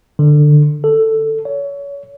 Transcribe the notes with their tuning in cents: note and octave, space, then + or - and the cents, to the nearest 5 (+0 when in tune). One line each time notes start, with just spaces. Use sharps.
D3 +15
A4 +10
C#5 +30